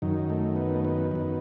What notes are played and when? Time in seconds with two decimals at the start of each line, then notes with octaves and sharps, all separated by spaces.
0.02 F#2 D#3
0.30 A3
0.56 B3
0.76 A3
0.85 B3
1.11 F#2 D#3